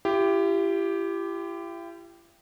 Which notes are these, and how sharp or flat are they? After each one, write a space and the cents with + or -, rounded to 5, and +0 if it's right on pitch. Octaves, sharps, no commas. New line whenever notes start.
E4 +45 G4 +0